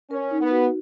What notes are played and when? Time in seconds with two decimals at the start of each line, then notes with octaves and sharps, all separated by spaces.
0.11 C#4 A#4
0.31 D#4
0.41 B3
0.51 F#4